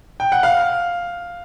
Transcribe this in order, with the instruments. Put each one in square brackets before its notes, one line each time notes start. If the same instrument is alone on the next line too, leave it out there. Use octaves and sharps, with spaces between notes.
[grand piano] G5
F#5
F5